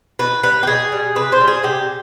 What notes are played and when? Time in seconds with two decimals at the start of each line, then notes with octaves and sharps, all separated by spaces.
0.19 B2 B4
0.43 G3 B4
0.63 G4
0.67 B2 G#4
0.92 G3
1.16 C3 B4
1.32 C5
1.40 G3
1.48 G#4
1.63 C3 G4